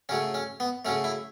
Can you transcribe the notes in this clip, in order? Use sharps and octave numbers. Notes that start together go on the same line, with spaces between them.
C#3 F#3 A3 C#4
C#4
B3
C#3 F#3 A3 C#4
E4